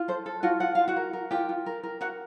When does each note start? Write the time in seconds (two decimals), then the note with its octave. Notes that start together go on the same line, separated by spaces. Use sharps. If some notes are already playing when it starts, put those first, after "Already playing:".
Already playing: F4
0.08 A4 C5
0.26 A4
0.43 F4 F#4 F#5
0.60 F4 F#5
0.75 F4 F5
0.88 F#4 F#5
0.96 A#4
1.13 A#4
1.31 F4 G4 G5
1.49 F4
1.66 A#4
1.83 A#4
2.01 F#4 A#4 F#5